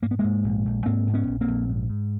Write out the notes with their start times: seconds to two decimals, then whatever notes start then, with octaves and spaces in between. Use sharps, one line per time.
0.02 G#2 A#3
0.11 B3
0.19 G#2 G#3 A#3
0.44 A#1
0.65 A#1
0.86 G#2 A#3 C4
1.07 G#2
1.14 B3 C#4
1.27 A#1
1.41 A#3 C4
1.48 A#1
1.70 G#2
1.89 G#2